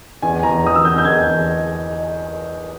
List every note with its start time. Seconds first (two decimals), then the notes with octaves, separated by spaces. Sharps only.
0.22 E2 G#5
0.43 E2 A#5
0.64 E3 D#6
0.75 E6
0.85 E2 G6
0.98 G6
1.05 E2 G#6
1.26 E2